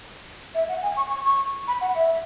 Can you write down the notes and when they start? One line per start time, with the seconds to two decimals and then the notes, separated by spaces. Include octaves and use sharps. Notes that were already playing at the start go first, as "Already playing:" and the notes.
0.54 E5
0.69 F#5
0.83 G#5
0.97 C#6
1.10 C#6
1.25 C#6
1.68 B5
1.81 F#5
1.95 E5